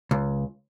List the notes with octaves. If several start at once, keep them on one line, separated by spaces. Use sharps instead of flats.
C#2